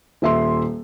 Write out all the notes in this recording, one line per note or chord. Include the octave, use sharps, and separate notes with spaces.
D#1 E5 C6